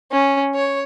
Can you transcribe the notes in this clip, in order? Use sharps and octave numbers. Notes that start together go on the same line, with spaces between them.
C#4
C#5